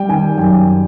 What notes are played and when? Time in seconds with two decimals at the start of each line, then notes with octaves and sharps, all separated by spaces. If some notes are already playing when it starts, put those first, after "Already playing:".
Already playing: G3 G5
0.09 D#3 G#5
0.38 F#2 G5